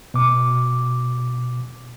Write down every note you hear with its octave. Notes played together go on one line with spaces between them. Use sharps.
B2 D6